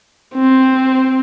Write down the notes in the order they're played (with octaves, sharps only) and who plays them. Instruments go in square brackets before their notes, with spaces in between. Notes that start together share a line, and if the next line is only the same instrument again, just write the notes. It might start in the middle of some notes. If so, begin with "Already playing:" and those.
[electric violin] C4